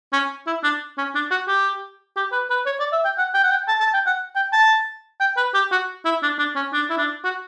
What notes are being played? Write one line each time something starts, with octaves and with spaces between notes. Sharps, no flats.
C#4
E4
D4
C#4
D4
F#4
G4
G4
B4
B4
C#5
D5
E5
G5
F#5
G5
F#5
G5
A5
A5
G5
F#5
G5
A5
G5
B4
G4
F#4
E4
D4
D4
C#4
D4
E4
D4
F#4